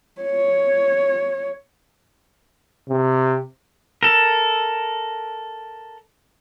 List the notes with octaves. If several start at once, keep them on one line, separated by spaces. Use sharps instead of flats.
C#5
C3
A4 A#4